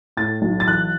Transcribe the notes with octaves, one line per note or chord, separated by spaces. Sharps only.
A2 A6
B1
A6
E3 F#6